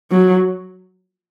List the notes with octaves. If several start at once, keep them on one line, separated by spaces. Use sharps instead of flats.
F#3